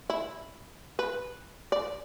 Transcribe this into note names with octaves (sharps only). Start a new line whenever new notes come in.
E4
B4
D5